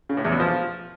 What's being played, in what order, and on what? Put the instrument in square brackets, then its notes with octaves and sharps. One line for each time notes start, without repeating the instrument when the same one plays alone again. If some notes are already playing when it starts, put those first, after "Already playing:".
[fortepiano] C#3
A2
E2
B2
F3